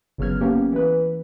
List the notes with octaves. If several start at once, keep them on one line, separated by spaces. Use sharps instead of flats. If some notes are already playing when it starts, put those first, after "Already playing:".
G1 C#3 F#3 B3 F6 G#6
A#3 B3 C#4 G4
E3 B4